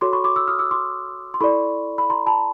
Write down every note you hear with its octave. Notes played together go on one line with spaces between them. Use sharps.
F#4 A4 C#5 C6 D6
B5 C#6
C6 D6
D6 E6
D#6 F6
D6 E6
C6 D6
C6
E4 A4 D5 B5 C#6
B5
A#5 C6
A5 B5